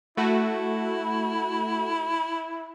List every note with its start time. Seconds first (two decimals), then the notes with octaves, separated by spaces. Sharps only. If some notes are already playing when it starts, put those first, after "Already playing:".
0.17 A3 E4 F#4